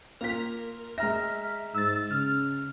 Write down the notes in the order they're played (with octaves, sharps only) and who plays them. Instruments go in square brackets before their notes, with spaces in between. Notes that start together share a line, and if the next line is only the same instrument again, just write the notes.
[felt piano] A#3 F4 B6 [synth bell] A#4
[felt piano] G#3 A#5 A#6 [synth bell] E5 F6
[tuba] G#2 [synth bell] E6 A6
[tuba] C#3 [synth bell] F6